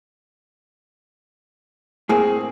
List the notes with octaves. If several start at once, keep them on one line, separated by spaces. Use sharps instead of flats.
A2 A#3 C4 G#4